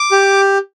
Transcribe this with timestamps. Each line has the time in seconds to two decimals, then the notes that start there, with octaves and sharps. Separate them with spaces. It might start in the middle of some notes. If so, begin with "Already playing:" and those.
Already playing: D6
0.12 G4